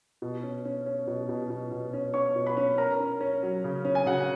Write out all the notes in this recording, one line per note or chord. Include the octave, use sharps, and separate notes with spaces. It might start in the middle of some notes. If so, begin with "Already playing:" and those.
B2
C#4
C#4
C#4
B2
B2
B2
B2
C#4
C#4 C#5 C#6
B2
B4 B5
C#4
C#4 A#4 A#5
C#4
C#4
F#3
C#3
C#4
G#5
C#3 F#4 F#5